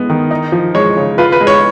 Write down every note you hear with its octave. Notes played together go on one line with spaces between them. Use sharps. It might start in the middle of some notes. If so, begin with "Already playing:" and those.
Already playing: G#3 B3
D#3
D#4
F3
G#3 C#5
C#3
F4 B4
B4
G#3
C#5